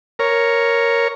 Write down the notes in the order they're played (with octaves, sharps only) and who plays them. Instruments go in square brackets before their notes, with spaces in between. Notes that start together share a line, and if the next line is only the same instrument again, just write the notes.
[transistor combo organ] A#4 C#5